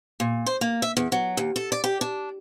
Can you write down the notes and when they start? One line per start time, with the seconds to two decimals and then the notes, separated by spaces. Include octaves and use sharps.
0.20 A#2
0.46 C5
0.61 A#3
0.82 E5
0.97 E2
1.12 F#3
1.37 D#2
1.56 A4
1.72 D5
1.84 G4
2.01 D4